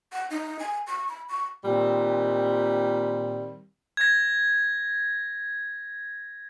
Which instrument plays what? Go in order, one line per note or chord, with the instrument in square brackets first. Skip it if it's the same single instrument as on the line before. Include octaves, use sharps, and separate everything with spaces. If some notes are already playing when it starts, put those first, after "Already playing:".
[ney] F#5
D#4
G#5
C#6
B5
C#6
[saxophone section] A#2 D#3 G3 C4
[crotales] G#6 A#6